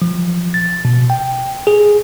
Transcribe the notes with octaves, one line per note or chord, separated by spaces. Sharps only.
F3
A6
B2
G5
G#4